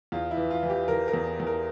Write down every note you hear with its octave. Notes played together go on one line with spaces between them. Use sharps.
E2 F4
E4
E3
F4
E3
G4
E3 A#4
A#4
E2
E2
A#4